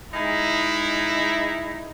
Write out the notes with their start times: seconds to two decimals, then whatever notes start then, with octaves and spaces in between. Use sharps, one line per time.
0.13 G#3 D#4 E4